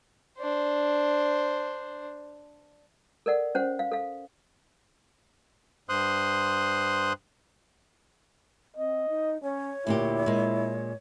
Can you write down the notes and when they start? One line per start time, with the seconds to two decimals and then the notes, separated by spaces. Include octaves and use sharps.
0.39 D4 C5
3.26 A4 A#4 D5 F#5
3.55 C#4 C5 F#5
3.79 F5
3.91 A4 F5
5.89 G2 C5 C6 D#6 F#6
8.76 C4 D#5
9.09 D#4
9.43 C#4 C#5
9.87 D2 A#2 E4 G4
10.26 A#2 G#3